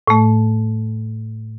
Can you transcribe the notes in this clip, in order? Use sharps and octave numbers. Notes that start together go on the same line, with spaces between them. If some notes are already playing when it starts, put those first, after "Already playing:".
A2 A3